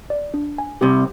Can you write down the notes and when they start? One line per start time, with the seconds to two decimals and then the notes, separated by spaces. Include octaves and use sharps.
0.10 D5
0.34 D4
0.58 G#5
0.81 C2 C3 G4